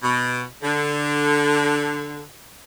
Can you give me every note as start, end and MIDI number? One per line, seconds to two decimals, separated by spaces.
0.02 0.43 47
0.62 2.22 50